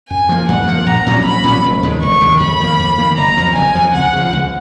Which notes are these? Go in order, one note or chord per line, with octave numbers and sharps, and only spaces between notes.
F#2 G#5
F3 A#3
F#2 F#5
F3 A#3
A#1 A#5
A#2 F#3 C#4
A#1 B5
A#2 F#3 C#4
F1
D#2 D#3 G#3
F1 C#6
D#2 D#3 G#3
F2 B5
D#3 A#3
F2
D#3 A#3
F#1 A#5
F2 F3
F#1 G#5
F2 F3
C#2 F#5
C#3 F3
C#2